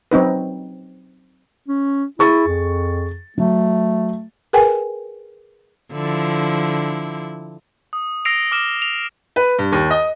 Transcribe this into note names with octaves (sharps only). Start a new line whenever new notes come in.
F#3 C4 D#4 B4
C#4
E4 G#4 C#6 A6
F2
F#3 A3
G#4 A#4 B4 G5 G#5
D3 F3 E4
D#6
E6 A#6 C7 D7 F7
D6 F6 E7
F7
B4
G2
D#2
D#5